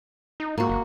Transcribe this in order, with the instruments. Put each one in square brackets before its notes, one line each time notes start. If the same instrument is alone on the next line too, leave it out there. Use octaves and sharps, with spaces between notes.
[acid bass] D#4
[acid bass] G#2 [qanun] A#3 F#4
[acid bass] F#1